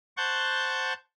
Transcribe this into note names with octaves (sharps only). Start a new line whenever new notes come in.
C5 F#5 A5 C#6 G6